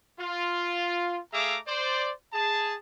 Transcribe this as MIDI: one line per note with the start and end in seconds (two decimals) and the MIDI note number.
0.20 1.18 65
1.33 1.57 57
1.33 1.57 68
1.33 1.57 76
1.33 1.57 77
1.33 1.57 82
1.33 1.57 86
1.67 2.11 72
1.67 2.11 74
2.33 2.74 68
2.33 2.74 81